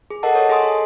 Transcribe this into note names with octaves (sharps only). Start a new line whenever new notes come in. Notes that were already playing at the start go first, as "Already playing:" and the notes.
G#4
A4 A#4 D#5 F#5 A5
A4 C#5 D#5 A5
G#4 D#5 G#5 C6 D#6
A4